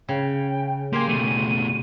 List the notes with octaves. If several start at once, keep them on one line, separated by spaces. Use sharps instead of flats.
C#3 G5
A#3 G4 G#5 C6
B2 A3 D#7